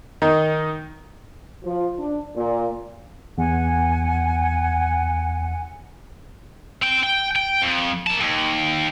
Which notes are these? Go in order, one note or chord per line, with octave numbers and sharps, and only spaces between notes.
D#3 D#4
F3
D4
A#2
E2 F#5 G#5
C4 G5
G5
G5
F2
A#3 A5
D#2